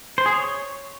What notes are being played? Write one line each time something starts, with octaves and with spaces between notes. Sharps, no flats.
C5
G#4
C#5